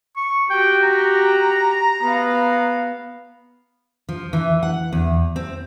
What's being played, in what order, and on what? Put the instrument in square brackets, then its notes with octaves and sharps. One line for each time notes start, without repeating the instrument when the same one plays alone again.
[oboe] C#6
[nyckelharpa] F#4 G4 [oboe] G5
[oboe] A#5
[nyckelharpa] B3 F5
[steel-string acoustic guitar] F3
E3
F#5
E2
C4